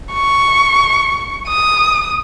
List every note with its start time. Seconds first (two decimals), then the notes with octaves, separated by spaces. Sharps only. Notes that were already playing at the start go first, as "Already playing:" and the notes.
0.13 C#6
1.48 D#6